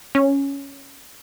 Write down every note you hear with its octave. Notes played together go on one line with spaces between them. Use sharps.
C#4